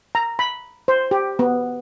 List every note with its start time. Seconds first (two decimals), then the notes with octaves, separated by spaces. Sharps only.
0.15 A#5
0.39 B5
0.88 C5
1.11 G4
1.39 B3